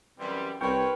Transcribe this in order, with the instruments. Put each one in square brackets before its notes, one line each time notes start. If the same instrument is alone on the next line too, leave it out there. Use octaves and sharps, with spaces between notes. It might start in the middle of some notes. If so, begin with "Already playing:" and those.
[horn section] F#2 E3 G3 [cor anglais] C4
[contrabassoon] C2 [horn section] C4 A#4 C#5 [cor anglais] B4 [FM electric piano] G5 C#6